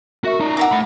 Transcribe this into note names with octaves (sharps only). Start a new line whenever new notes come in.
F#4 A#4 E5 C#6
D#4 D5 A#5
F#4 E5 D6
A3 B5